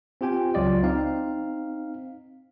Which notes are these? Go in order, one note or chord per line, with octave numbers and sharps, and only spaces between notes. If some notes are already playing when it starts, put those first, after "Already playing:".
C4 F4 G4 G5 G#5
C#2 F#3 F4 D5 D#5
C4 D#4 F5